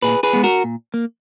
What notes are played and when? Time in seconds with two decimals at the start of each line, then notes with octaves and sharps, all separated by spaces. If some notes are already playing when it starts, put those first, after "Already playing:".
0.02 A#2 G#4 B4
0.23 G#4 B4
0.33 G#3 B3
0.44 F#4 A#4
0.64 A#2
0.94 A#3